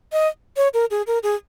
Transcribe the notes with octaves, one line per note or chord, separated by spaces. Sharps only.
D#5
C#5
A#4
G#4
A#4
G#4